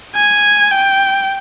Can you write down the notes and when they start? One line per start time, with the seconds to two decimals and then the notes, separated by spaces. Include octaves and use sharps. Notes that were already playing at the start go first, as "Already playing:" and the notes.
0.16 G#5
0.71 G5